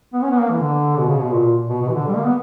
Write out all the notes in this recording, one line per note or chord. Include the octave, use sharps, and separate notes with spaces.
B3
C#4
B3
A#3
E3
D3
B2
C#3
B2
A#2
B2
B2
E3
D3
G3
A#3
B3